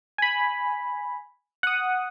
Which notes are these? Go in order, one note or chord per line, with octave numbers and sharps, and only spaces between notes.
G#5 B5
F#5 D#6